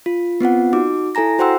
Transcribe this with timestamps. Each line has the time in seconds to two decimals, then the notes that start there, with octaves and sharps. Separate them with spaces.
0.06 F4
0.40 B3 C4 F4 F#5
0.73 D#4 F#4 D6
1.15 E4 A4 G#5 A#5 A#6
1.39 F#4 C5 F#5 G5 C6 E6